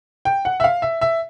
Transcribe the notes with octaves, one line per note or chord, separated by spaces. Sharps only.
G5
F#5
E5
F5
E5
E5